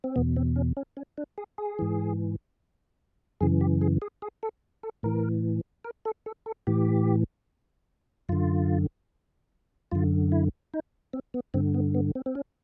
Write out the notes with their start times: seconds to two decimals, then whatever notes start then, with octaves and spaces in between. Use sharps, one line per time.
0.04 C4
0.16 E2 B2 B3
0.36 C4
0.56 C#4
0.77 C#4
0.97 C#4
1.18 D4
1.38 G#4
1.58 G#4
1.79 G#2 E3
3.41 F#2 C#3 E3 G#4
3.61 G4
3.81 G#4
4.02 G#4
4.22 G#4
4.43 A4
4.83 A4
5.03 A2 E3 A#4
5.84 A#4
6.05 A4
6.26 A4
6.46 A4
6.67 A2 E3 G4
8.29 F#2 D3 F4
9.92 F#2 D3 F4
10.32 E4
10.74 D#4
11.13 C4
11.34 B3
11.54 G2 D3 C4
11.74 B3
11.94 B3
12.15 C4
12.26 C4
12.35 C#4